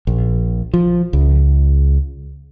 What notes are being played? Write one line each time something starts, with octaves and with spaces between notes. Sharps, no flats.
A#1
F3
C#2